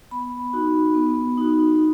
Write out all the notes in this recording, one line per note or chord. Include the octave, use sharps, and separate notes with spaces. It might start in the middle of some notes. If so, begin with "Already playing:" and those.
B3 B5
D#4 F#4
B3
D#4 F#4